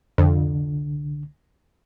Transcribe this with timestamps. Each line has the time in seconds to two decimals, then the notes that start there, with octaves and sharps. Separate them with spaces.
0.18 C2 F2 D3